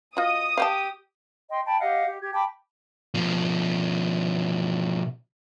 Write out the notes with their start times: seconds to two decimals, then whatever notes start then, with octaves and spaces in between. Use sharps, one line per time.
0.17 F4 F#4 D#5 D#6
0.58 G4 F5 G5 A5
1.50 D#5 G5 C6
1.66 G5 A5 B5
1.81 G4 D#5 F5 F#5
2.08 G4
2.21 G4 G#6
2.33 G5 A5 B5 D6
3.14 B2 F3